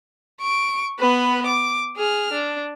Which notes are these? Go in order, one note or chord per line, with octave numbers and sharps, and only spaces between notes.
C#6 D7
B3 B4
D6
G#4 F6
D4